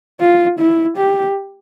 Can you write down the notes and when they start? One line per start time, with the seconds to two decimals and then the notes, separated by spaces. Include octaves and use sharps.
0.21 F4
0.59 E4
0.97 G4